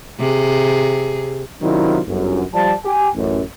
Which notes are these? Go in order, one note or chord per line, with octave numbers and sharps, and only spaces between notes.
C3 G#4
C3 D#3 F#3 D4 E4 F4
G1 F#2
F3 G3 D5 A5
G4 G#5
A1 F#2